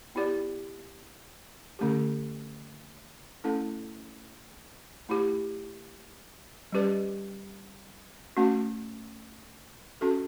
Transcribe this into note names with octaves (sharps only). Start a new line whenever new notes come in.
B3 E4 G4 D5
D3 A3 C#4 G4
A3 C#4 E4 A4
A3 E4 G4
G3 C#4 G4 B4 D5
A3 C#4 F#4
C#4 F#4 A4